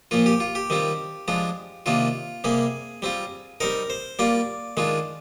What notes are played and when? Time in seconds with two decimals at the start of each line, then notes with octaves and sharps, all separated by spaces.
0.11 A#2 F3 A#3 F4
0.26 G4
0.40 F4
0.55 G4
0.70 D#3 G3 C4 F4
1.28 F3 G#3 D4 F4
1.86 C3 D#3 A#3 D4 F4
2.44 C3 G3 A#3 G#4
3.02 G3 C4 F4
3.60 G3 C4 D#4 A#4
3.90 C5
4.19 G3 A#3 F4 D5
4.77 D#3 G#3 D4 F4